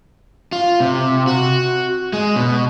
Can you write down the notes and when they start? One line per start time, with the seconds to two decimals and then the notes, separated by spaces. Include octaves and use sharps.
0.52 F4
0.80 C3
1.27 F#4
2.13 G#3
2.36 B2